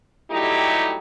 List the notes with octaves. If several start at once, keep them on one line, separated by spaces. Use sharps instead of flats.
F#3 G3 A3 D#4 E4 G4